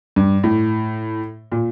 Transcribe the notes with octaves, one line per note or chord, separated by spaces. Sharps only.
G2
A2
A#2